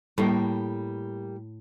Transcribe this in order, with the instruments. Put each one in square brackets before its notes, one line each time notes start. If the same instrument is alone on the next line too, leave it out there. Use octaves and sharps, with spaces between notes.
[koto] A2 [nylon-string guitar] G3 A#3